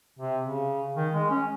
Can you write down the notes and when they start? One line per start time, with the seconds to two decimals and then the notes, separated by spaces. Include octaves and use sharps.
0.19 C3
0.44 C#3
0.96 D#3
1.14 G#3
1.30 C#4